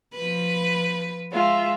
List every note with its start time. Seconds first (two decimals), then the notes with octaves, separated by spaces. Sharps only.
0.15 F3 B4
1.33 G#3 F4 E5